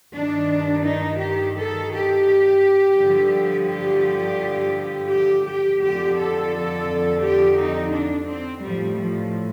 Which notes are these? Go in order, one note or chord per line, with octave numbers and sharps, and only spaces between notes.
G2 D#3 D4
D#4
G4
A4
G4
G2 D3 F3
G4
G4
G4
F2 D3 F3 G4
A4
G4
D#4
D4
C4
A2 F3 G3
F3